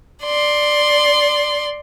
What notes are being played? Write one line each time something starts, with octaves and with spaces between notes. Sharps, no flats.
D5 C6